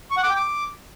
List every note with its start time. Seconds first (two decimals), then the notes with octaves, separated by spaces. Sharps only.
0.11 C#6
0.17 F#5
0.23 D6
0.29 G5
0.36 D6